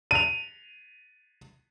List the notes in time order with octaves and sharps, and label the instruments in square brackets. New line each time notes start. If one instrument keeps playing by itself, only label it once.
[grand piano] D#7 F7